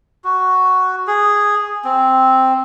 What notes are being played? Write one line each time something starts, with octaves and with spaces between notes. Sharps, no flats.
F#4
G#4
C4